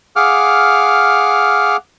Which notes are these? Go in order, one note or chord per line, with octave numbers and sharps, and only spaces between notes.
G#4 F5 F#5 D6 F6